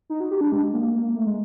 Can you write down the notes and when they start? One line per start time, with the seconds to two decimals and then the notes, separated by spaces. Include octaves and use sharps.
0.10 D#4
0.20 F#4
0.31 G4
0.41 D4
0.52 G#3
0.74 A#3
0.95 A#3
1.05 A#3
1.16 A3
1.26 G#3